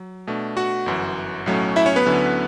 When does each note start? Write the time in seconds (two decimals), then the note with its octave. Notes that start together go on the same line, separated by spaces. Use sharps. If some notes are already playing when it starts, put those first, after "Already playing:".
Already playing: F#3
0.27 B2 A3 D4
0.57 F#4 F#5
0.86 G1 F#2 E3
1.46 B1 A2 F#3 A3 C#4
1.76 E4 E5
1.86 C#4 C#5
1.96 B3 B4
2.05 D2 D3 F#3 C#4 E4